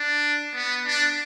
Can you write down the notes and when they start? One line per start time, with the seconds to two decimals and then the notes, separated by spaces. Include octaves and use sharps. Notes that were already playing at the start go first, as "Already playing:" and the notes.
Already playing: D4
0.54 B3
0.85 D4